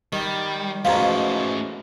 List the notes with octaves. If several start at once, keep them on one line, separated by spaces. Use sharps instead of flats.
D#3 G3
G#2 B2 F3 A3 C#4 F5 A#5